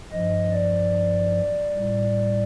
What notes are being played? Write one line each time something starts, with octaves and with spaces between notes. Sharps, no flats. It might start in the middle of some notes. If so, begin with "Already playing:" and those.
G2 F3 D#5
D5
A2 G3